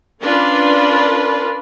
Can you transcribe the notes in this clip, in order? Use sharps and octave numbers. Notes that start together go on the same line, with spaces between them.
C#4 D4 F4 A#4 B4 D5